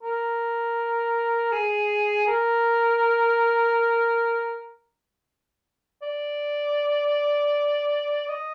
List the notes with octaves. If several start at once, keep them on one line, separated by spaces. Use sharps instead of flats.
A#4
G#4
A#4
D5
D#5